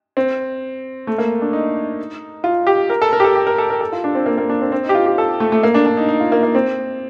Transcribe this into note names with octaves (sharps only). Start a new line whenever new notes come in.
C4
A3
A#3
D4
D#4
F4
G4
A#4
A4
A#4
G4
A4
G4
A#4
A4
A#4
A4
F4
D4
C4
A#3
A#3
D4
C4
C4
D#4
G4
F4
G4
A4
A3
A3
A#3
D4
D4
D#4
D#4
F4
A#3
A#3
C4